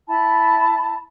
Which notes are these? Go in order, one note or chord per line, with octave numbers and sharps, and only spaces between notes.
E4 A5 B5